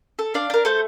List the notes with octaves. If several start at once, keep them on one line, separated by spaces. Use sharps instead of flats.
A4
D4 D5 F5
D4 A#4
A3 A4 C5